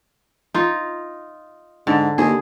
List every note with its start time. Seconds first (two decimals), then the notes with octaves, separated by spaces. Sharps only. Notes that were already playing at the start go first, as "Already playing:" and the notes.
0.54 D#4 F4
1.87 G#2 D3
2.18 D#2 G#4